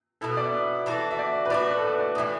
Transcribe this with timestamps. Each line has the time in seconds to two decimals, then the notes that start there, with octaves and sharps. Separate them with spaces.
0.21 B2 B3 E4 A4
0.29 B4
0.37 D5
0.46 E5
0.86 E3 D4 F#4 A4
1.11 E5
1.19 D5
1.45 B4
1.50 A2 A3 F#4 D5
1.67 B4
1.77 A4
1.84 B4
2.00 D5
2.15 A2 E3 B3 B4